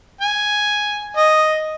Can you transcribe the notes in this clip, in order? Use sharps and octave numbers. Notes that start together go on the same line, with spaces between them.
G#5
D#5